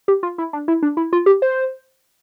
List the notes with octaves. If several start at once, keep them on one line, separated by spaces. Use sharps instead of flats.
G4
F4
E4
D4
E4
D4
E4
F4
G4
C5